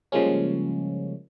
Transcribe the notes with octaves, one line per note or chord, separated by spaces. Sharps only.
C#3 F3 G3 G#3 A#3 C#4